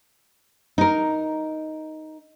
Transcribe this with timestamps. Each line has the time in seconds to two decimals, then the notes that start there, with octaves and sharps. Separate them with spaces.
0.78 D#4 A#4